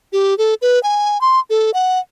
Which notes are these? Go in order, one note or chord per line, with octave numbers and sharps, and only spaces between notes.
G4
A4
B4
G#5
C6
A4
F#5